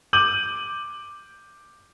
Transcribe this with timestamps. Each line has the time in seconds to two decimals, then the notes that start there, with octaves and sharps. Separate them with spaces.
0.13 D6 G6 D#7 F#7